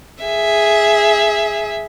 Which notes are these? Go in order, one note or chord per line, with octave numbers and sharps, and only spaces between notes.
G#4 E5